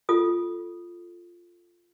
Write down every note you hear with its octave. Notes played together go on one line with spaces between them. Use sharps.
F4 A4 D#6